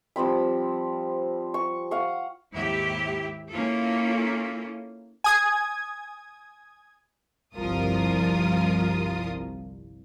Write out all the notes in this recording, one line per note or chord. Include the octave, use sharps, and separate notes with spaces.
F3 G3 C4 B5
C#6
F5 F#5 C#6
D#2 G#2 E4 G4 E5
A#3 C#4 E4 F4 A4
G#5 D#6 G#6
G1 C2 F3 F4 A#4 D#6